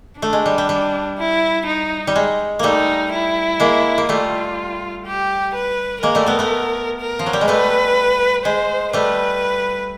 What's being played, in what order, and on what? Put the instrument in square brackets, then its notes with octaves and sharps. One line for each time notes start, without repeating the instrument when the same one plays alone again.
[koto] A3 [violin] D4
[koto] G#3
G3
G3
G3
[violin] E4
D#4
[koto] G3
G#3
[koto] G3 A3 A#3 [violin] D#4
[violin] E4
[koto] G#3 A#3
A#3
[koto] G3 A3 [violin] F4
[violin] G4
B4
[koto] G#3 A#3 [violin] A#4
[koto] G3 A3
A3 B3
A3 B3
[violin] A#4
[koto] F3
F#3
G3
G#3
[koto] G3 A3 [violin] B4
[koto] G#3 [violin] C5
[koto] G3 A3 [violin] B4